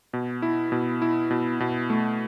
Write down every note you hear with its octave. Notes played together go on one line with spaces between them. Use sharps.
B2
E4
B2
E4
B2
B2
A3